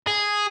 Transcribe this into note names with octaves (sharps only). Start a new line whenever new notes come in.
G#4